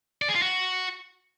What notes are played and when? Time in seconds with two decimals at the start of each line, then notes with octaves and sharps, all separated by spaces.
0.22 D5
0.28 G#4
0.35 F4
0.42 F#4